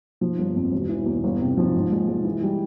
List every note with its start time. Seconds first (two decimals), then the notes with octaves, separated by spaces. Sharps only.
0.21 F3
0.38 G1
0.56 F2
0.72 E1
0.89 E3
1.06 E2
1.24 G1
1.41 C3
1.57 F3
1.75 G#2
1.92 G#3
2.08 G#3
2.25 E3
2.42 G3